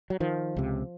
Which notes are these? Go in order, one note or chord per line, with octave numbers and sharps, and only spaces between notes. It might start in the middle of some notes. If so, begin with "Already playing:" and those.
F#3
D#3 F3
C#2 C3